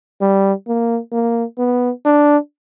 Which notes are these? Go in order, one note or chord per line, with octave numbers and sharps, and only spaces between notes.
G3
A#3
A#3
B3
D4